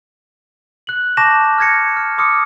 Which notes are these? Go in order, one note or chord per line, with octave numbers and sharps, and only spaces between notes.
F#6 F#7
A5 C#6 D6 G6 A#6 E7
F6 G6 G#6 A#6 C#7
F6
C6 D6 D#6 F6 C#7